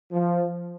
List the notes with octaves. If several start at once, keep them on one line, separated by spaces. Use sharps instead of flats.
F3